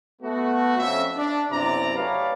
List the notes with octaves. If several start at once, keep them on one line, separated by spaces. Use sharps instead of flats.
A3 B3 F#4
F2 C#4 E5
D4
B1 F#2 C3 E4 D5 A#5
A3 G4 B4 C#5 D5 F5